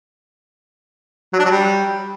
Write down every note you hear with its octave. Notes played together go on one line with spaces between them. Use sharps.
F#3
D4
F#3
G3